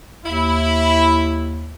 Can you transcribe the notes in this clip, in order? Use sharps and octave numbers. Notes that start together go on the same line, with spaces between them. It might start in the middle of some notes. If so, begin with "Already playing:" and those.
D#2 E4